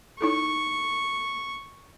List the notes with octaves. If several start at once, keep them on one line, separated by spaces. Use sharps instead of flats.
D#4 E4 A4 C#6